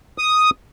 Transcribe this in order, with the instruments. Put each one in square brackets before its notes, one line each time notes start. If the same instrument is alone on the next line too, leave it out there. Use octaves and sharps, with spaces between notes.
[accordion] D#6